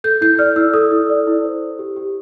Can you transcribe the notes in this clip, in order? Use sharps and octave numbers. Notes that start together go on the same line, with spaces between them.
A4 G6
E4 G6
D5 F6
E4 E6
A4 D#6
E4
D5
E4
C5
C5
G4
G4